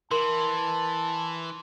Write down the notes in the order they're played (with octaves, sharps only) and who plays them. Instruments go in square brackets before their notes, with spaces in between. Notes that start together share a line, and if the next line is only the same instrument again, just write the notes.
[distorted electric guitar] E3 [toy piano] A#4 [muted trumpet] A5 [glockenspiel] C6